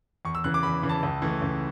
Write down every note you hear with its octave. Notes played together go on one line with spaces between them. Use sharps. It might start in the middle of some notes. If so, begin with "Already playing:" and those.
E2 C#6
E6
C#3 E3 F#6
D6
E2 B5
C#3 E3
A5
C#2
C#3 E3 A3
C#2